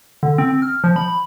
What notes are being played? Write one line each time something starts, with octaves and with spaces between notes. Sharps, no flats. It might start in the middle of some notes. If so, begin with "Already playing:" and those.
D3
C4
F6
F3
B5